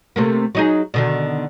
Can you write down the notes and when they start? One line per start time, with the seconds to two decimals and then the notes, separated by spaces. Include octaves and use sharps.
0.16 C3 A3 A#3
0.55 F#3 D#4 G#4
0.94 B2 D3 D#3